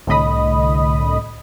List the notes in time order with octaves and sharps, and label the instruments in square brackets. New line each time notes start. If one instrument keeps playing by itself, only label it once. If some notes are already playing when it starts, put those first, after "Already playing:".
[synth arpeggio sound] C2 A2 D3 D#5 B5 D#6